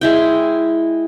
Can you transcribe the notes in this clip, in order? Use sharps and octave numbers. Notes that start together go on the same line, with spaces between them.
G#3 E4 G5